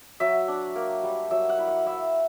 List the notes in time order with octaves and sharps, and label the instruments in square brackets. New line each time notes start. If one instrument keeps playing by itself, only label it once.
[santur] F#3 E5
D4
A#3
G3
F#3 E5
F#5
E4
F#5
E4 E5